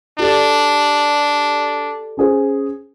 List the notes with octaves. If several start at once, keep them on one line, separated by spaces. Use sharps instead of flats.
D4 G4 A4 D5
C#4 G#4 C5